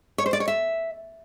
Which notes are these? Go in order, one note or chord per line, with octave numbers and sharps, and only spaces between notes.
C#5
C5
D5
C#5
E5